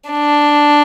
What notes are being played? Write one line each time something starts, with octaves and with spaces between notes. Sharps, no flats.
D4